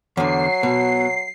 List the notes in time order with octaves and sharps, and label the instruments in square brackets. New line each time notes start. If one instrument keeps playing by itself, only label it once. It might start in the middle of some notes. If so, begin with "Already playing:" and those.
[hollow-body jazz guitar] E2 D3 [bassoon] F#3 [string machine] C7
[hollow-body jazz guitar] B2